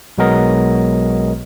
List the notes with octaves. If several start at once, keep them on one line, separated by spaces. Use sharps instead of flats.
B1 F#3 G#3 B3 A#4 D#5